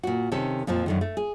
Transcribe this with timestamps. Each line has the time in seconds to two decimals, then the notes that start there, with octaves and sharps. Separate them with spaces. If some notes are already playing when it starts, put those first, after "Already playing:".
0.03 A#2 F#4
0.32 C3 D#3 C#4 A4
0.67 F2 A#2 F3 A5
0.86 F#2 D3 D#3
1.01 A3
1.17 G#4